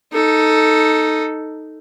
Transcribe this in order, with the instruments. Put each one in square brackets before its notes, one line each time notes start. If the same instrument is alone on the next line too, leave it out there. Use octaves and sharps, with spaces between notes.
[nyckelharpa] D#4 A4